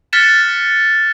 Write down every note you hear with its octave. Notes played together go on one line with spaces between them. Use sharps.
F6 F#6 A6 B6 C#7 E7